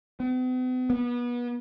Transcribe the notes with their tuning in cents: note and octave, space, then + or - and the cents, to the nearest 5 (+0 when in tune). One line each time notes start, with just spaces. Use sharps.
B3 +45
B3 -30